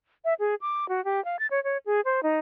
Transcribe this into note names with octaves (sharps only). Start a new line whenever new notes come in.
E5
G#4
D6
F#4
G4
F5
A6
C#5
C#5
G#4
C5
D#4